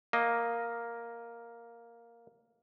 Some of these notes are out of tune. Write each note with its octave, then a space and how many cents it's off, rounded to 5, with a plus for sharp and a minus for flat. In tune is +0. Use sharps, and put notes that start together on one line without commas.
A#3 +0 D#5 +0